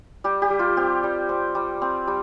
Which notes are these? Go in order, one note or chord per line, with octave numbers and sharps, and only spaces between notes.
G3 G4
G4
G3
F4
C4 G4
G3
C4
G3
C4
G3